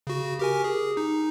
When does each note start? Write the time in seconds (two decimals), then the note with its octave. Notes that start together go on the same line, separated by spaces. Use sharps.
0.07 C#3 F#4
0.39 G4 A#4 G#5
0.64 G#4
0.97 D#4